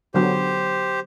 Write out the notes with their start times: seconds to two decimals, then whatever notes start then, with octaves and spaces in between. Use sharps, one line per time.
0.14 D3 F#3 B3 G4 C5